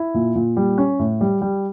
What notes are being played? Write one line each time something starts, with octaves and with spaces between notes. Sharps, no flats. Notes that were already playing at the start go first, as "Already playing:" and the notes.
Already playing: E4
A#2
A#2
G3
C#4
A2
G3
G3